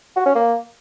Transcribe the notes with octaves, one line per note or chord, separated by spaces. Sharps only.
F#4
C#4
A#3